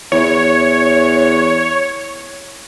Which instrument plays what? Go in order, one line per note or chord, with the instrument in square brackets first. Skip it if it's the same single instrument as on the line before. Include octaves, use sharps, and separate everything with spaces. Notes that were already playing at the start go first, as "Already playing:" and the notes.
[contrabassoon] E2 [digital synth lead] C#5